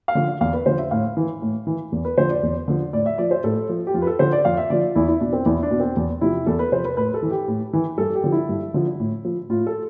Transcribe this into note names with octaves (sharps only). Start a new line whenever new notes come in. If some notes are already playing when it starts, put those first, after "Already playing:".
F5
D3 F3
E2 F5
B4
D3 F3 C5
E5
A2 F5
E3
A2
E3
E2
B4
D3 F3 C5
D5
E2
D3 F3
A2 D5
E5
F3 D5
C5
A2 A4
F3
G4
F2 F4
B4
A4
D3 F3 C5
D5
F2 F5
E5
D3 F3 D5
F4
E2 E4
E4
B2 D4
C4
E2 E4
D4
B2
C4
E2
C3 F3 E4
E2 A4
B4
C3 F3 C5
B4
A2 B4
A4
E3
G4
A2
E3
G2 A4
G4
D3 F3
E4
G2
D3 F3
A2
F3
A2 F4
A4